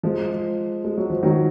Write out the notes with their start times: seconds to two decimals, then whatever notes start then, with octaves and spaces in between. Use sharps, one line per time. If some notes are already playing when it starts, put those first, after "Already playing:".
0.03 F3 G#3
0.85 G#3
0.98 F#3
1.10 F3
1.23 D#3 F#3